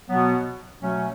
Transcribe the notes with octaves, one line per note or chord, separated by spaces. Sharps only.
B2 F#3 B3
B2 F#3 A3 C#4